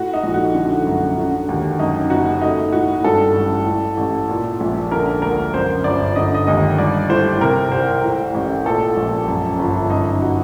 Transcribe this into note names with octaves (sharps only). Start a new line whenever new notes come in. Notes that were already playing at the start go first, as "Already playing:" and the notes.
Already playing: A2 F#4
D#4
A#1
F#4
D3
F#2
D3
D#2
F#2 D#4
F#1 F#4
A3 D#4
A2 F#4
G2 A4
A1
A2
A1
A#2
A#1
D3 A#4
D2 A#4
F#2 C5
G1 D5
D3 D#5
D#5
D#2 D#5
G3 D5
A2 C5
C3 A#4
C2 C5
A2
A1
A#2 A4
A#1
F#2
G1
F#2 D#4
F#4